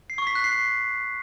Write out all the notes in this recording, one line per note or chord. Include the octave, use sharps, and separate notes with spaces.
C7
C#6
B6
F#6
C7